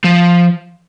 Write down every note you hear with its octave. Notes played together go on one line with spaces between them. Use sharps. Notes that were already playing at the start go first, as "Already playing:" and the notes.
F3